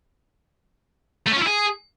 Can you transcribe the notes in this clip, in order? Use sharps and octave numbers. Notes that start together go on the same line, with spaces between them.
A3
C#4
F4
E4
G#4